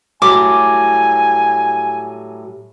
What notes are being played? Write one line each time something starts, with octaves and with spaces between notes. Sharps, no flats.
A2 F#3 G3 G#5 D6